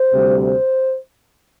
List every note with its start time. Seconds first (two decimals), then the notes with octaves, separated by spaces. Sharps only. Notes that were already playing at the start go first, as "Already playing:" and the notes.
Already playing: C5
0.12 D2 C3 G3
0.42 C5